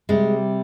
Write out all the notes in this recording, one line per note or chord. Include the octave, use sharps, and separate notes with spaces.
C3 G3 G#3